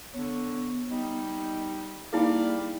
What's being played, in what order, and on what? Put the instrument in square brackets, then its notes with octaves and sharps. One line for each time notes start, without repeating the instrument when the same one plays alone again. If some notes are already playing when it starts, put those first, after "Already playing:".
[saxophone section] D3 C#5 [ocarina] B3
[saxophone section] G3 D#4
[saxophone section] G3 D5 F5 [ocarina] A#3 [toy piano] D#4 E4 G#4